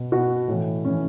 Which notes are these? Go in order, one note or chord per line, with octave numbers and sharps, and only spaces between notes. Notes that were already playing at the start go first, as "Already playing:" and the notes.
Already playing: B2
B2 F#4
A2 E3
A2 E3 C#4